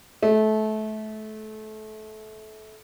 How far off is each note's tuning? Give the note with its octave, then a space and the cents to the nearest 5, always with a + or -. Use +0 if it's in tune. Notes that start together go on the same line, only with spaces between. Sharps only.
A3 -25